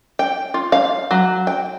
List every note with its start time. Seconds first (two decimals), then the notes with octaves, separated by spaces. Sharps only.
0.19 G5
0.54 F4
0.72 F5
1.11 F#3
1.47 G5